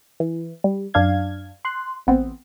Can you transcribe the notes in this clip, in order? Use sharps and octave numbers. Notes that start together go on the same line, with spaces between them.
E3
G3
F#2 D4 F5 G#6
C6 F#6
A1 B3 C4